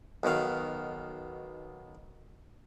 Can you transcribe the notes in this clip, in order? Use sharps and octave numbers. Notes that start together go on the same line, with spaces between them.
B1 B2 D#3 F5